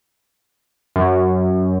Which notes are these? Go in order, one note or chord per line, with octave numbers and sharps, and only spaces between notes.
F#2